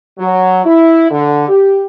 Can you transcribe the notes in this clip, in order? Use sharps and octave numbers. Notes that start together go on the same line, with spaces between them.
F#3
E4
D3
G4